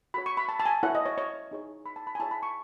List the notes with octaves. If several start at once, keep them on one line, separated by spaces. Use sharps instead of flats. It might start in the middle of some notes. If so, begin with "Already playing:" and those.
F#4 A4 C#5 B5
C#6
B5
A5
A5
G#5
E4 A4 C#5 F#5
D#5
C#5
C#5
D#4 G#4 C#5
B5
A5
B5
G#5
E4 G#4 C#5 A5
B5
C#6